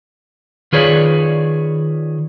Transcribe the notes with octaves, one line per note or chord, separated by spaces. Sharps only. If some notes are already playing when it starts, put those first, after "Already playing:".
D#3 F4 G#4 B4 C#5 D5